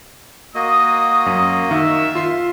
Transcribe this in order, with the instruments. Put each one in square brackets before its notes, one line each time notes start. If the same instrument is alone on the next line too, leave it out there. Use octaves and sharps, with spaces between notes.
[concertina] A#3 F#4 D#5 [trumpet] D#6
[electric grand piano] F#2
[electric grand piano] D#3 [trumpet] E5
[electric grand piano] F4 C6 C7